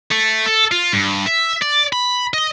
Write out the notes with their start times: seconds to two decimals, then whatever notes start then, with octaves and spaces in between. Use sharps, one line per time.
0.11 A3
0.46 A4
0.72 F4
0.93 G2
1.27 E5
1.62 D5
1.93 B5
2.34 D#5